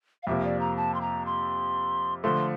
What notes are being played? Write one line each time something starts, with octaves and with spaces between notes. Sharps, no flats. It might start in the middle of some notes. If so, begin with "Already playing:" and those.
F5
F2 C3 F3 A#3 E5
D5
A#5
A5
C6
A#5
C6
D3 F3 A3 C6